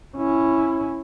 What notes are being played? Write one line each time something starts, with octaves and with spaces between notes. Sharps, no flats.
C#4 E4